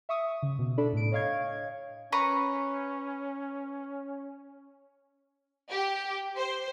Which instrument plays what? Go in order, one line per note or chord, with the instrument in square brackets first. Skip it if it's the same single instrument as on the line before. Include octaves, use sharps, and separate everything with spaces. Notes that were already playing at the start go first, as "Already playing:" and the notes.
[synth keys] E5 C#6 D#6
C#3
B2
D4 A4 D5 B5
A2 D7
C#5 D#5 F5 C#6 G#6
[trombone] C#4 [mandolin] B4 A#5 C#6
[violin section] G4
C5